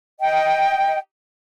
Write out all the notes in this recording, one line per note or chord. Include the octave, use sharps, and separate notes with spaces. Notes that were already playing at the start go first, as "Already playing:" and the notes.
D#5 G5